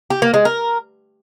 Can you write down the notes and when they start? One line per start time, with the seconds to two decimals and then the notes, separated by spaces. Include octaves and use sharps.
0.10 G4
0.22 A#3
0.34 G#3
0.45 A#4